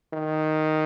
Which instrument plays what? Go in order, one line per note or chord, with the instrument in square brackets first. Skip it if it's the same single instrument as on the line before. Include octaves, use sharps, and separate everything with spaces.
[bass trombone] D#3